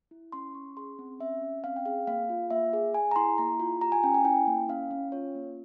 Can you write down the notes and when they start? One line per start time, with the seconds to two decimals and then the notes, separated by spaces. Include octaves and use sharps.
0.11 E4
0.32 C#4 C6
0.55 C#4 C#6
0.77 G#4 C6
0.99 C4
1.20 C#4 E5
1.42 C#4
1.64 C4 F5
1.76 G5
1.86 G#4 F5
2.07 A#3 F5
2.30 F4
2.51 A#3 E5
2.73 G#4
2.94 G#4 G#5
3.11 A#5
3.16 E4 C6
3.38 A#3 A#5
3.60 F4
3.81 G4 A#5
3.92 G#5
4.03 C#4 G5
4.14 G#5
4.25 E4 G5
4.47 A#3
4.69 C#4 F5
4.91 C#4
5.12 F4 C#5
5.35 A#3